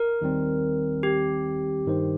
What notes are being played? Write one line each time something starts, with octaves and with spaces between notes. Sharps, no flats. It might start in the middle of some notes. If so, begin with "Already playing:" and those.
Already playing: A#4
D#2 D#3 G3 C4
G4
G2 D#3 G3 D#4 C5